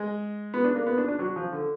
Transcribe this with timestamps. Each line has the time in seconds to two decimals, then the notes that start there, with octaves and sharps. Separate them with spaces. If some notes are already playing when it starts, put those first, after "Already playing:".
Already playing: G#3
0.54 B3
0.64 D4
0.76 A#3
0.86 B3
0.98 D4
1.08 D4
1.19 F#3
1.36 F3
1.52 D3